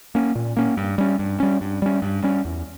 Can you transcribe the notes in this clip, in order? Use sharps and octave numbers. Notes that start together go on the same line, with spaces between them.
A#3 C#4
A#2
A#3 C#4
G2
G3 C#4
G2
G3 C#4
G2
G3 C#4
G2
G3 C#4
E2